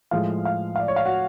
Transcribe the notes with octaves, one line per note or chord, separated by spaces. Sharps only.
A2 F3 G#3 F5
F5
F5
D5
C#5
F5
F#4